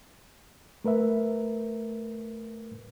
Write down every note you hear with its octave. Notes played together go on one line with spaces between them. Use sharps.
A3 A#4 B4 E5